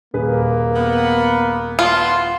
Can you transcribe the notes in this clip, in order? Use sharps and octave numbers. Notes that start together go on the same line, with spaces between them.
D#1 A#3 G#4 B4
B3
B3 F4 A5 C6